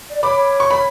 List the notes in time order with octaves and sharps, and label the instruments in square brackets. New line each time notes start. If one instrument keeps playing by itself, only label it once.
[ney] D5
[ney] C#5 [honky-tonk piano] B5 D6
[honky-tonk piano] C#6
B5